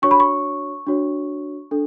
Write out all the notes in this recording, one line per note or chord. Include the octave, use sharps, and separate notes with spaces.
D4 F#4 C#5 C#6
B5
C#6
D4 F#4 C#5
D4 A4